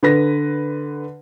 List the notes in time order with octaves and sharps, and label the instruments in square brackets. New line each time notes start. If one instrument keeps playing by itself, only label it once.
[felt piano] D3 B4 A#6